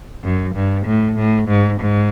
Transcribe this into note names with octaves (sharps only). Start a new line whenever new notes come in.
F#2
G2
A2
A2
G#2
G#2